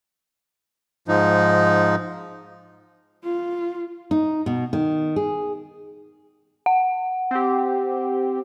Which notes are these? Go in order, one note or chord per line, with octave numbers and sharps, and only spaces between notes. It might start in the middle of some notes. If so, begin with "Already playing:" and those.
G#2 F3 D#4
F4
D#4
B2
D#3
G#4
F#5
C4 G4